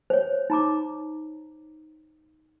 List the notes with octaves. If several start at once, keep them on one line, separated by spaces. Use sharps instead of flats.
C5 C#5
D#4 A#5 D6